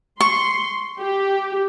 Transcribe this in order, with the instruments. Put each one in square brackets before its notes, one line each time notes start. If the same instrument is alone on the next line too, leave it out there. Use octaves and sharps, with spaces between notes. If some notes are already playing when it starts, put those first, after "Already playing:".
[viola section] C6 [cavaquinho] C#6
[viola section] G4